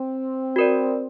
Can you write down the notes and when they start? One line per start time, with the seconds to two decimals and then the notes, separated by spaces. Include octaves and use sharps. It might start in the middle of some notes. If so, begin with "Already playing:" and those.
Already playing: C4
0.56 F#4 A#4 D5